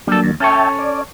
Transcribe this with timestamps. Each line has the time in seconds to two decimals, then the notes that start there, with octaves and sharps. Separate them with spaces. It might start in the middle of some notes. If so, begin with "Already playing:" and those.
0.07 F#3 G3 A#3 D4 A4
0.24 D#2
0.40 C#4 A4 C#5 E5 G5 A5
0.79 D5